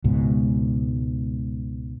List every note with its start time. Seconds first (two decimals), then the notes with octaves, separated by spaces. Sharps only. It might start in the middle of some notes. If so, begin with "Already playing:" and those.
0.04 C#2 G#2 B2